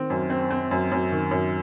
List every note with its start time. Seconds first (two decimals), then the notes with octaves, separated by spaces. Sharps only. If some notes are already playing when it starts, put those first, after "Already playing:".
Already playing: D#3 C4
0.10 F#2
0.30 C4
0.51 C4
0.71 F#2
0.92 F#2
1.12 D#3
1.31 F#2